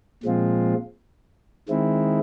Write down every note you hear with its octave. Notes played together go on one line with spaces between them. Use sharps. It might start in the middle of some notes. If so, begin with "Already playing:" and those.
A#2 F3 G#3 C4 F4
D#3 G#3 C4 E4